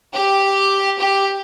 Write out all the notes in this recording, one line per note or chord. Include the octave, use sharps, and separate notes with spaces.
G4
G4